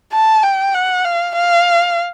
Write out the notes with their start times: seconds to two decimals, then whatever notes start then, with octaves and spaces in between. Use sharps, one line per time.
0.13 A5
0.43 G5
0.74 F#5
1.05 F5
1.35 F5